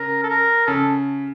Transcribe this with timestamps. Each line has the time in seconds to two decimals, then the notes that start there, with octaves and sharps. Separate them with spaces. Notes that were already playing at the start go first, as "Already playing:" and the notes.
Already playing: C#3 A#4
0.23 A4
0.29 A#4
0.67 C#3 A4